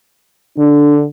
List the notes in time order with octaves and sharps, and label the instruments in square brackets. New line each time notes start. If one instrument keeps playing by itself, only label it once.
[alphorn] D3 [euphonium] D4